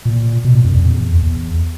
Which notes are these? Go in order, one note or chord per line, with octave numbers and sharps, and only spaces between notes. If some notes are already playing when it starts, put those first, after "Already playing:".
A#2
B2
A#2
F#2
F2
E2
E2